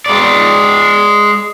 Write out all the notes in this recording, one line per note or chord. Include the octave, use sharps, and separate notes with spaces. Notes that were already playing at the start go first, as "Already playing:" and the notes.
G#3 D5